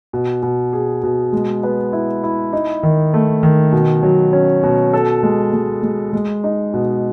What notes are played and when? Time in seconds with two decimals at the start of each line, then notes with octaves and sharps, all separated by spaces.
0.13 B2
0.43 B2
0.73 G#4
1.03 B2
1.33 G#3
1.63 B3
1.93 E4
2.23 E4
2.53 D#4
2.83 D#3
3.14 A3
3.43 D#3
3.72 B2
4.03 F#3
4.33 C#4
4.63 B2
4.93 A4
5.23 G#3
5.53 G#3
5.83 G#3
6.13 G#3
6.44 D#4
6.74 B2